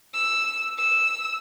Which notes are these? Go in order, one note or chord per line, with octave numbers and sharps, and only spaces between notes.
E6
E6